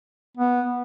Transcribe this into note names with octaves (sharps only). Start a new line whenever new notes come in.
B3